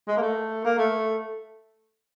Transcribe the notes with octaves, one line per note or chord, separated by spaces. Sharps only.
G#3
A#3
A3
A#3
A3